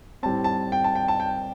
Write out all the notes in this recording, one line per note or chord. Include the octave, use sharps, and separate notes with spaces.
A2 G3 C4 A5
A5
G5
A5
G5
A5
G5